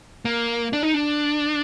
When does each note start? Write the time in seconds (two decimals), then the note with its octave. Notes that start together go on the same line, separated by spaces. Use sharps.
0.25 A#3
0.73 D4
0.83 D#4
0.94 D4